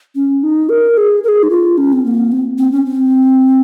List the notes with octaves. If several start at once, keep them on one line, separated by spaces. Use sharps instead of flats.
C#4
D#4
A#4
G#4
A#4
G#4
D#4
F4
C#4
C4
A#3
C4
C4
C#4
C4